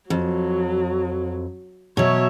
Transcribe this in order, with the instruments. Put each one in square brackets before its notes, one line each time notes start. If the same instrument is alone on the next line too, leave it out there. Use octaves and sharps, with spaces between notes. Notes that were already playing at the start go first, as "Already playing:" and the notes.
[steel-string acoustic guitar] F2 [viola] F#3
[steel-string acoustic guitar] B2 F#3 [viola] C#5 E5